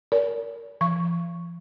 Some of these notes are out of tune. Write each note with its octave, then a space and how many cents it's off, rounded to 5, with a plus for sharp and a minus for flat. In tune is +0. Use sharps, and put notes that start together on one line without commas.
A#4 +0 D5 -45
F3 -40 C#6 +0